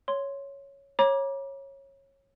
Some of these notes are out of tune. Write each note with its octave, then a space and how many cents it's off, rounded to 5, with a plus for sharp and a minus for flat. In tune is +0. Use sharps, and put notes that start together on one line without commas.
C#5 +0 C6 +0
C#5 -15 A#5 +40 D6 +5